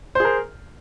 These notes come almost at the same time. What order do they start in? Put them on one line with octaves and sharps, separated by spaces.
C5 G#4 A#4